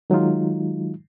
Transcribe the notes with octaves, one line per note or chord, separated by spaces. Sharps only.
D#3 F#3 G#3 D#4 F4